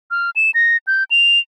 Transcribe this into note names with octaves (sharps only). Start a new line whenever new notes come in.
F6
E7
A#6
G6
F7